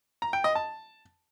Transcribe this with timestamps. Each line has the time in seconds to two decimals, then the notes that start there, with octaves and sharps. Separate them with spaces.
0.22 A#5
0.33 G5
0.44 D#5
0.55 A5